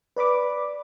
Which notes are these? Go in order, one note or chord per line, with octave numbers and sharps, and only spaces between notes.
B4 D5 B5 D6